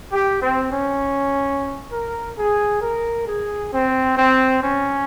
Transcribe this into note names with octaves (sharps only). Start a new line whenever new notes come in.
G4
C4
C#4
A#4
G#4
A#4
G#4
C4
C4
C#4